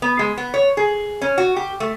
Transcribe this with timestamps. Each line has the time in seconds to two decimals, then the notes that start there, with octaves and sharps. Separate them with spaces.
0.02 B3
0.19 G#3
0.38 B3
0.54 C#5
0.77 G#4
1.22 C#4
1.38 F#4
1.56 G4
1.80 A3